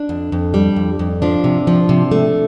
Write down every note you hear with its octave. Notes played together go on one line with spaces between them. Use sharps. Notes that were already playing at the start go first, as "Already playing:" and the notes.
Already playing: D4
F2
F2
G3
F2
F2
F3 D4
C3
F3
C3
A3